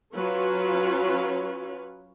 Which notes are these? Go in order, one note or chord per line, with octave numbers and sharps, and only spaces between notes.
F#3 C#4 F4 B4 C#5